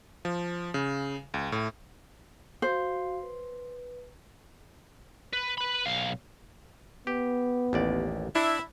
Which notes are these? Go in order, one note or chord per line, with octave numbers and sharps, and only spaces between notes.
F3
C#3
C#2
A2
F#4 C5 F5
B4
B4
B4 B5
B1 F5
B3 G4
A1 D#2 D5
D4 E4